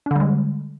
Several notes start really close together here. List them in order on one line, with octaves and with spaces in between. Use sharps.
D4 D3 G3 G#3